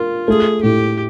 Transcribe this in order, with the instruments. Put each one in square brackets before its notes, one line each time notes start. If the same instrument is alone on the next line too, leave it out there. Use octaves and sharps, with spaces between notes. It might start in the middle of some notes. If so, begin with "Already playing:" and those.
Already playing: [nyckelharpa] F4 [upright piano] A#4
[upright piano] A3 [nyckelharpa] G#4
[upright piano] A2 [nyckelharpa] G4